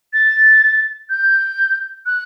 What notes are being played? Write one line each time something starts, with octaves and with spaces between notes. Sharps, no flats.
A6
G6
F#6